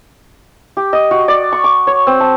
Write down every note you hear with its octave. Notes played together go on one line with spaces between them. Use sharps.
G4
D#5
F#4
D5
C#6
D6
C#5
C4
A5